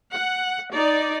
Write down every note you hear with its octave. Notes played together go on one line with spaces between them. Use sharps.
F#5
D#4 D5